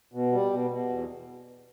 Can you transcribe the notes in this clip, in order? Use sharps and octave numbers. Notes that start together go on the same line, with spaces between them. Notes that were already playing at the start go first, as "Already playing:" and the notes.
B2
G3
B2
B2
E2